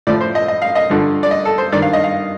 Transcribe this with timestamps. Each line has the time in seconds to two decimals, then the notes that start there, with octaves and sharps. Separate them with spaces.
0.07 A2 F3 D5
0.21 C5
0.35 D#5
0.48 D#5
0.62 F5
0.75 D#5
0.90 G2 D3 F3
1.23 D5
1.31 D#5
1.45 A4
1.58 C5
1.72 G2 D#3 D5
1.82 F5
1.93 D#5
2.04 F5